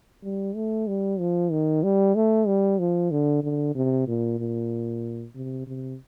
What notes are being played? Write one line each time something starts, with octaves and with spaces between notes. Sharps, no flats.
G3
A3
G3
F3
D#3
G3
A3
G3
F3
D3
D3
C3
A#2
A#2
C3
C3